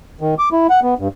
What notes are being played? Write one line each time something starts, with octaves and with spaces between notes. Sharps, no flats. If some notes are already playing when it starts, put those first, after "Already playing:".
D#3
D6
E4
F#5
B3
G2